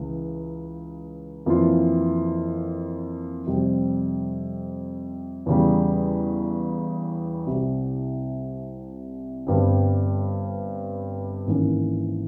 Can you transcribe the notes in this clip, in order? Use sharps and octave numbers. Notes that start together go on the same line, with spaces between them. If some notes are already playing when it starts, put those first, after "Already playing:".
Already playing: C#2 C#3 E3
F2 E3 A#3 F4
F2 C3 G3 C4
E2 C#3 G3
C2 C3 G3
G1 G2 G3 C4
G#1 G#2 E3 A#3 C#4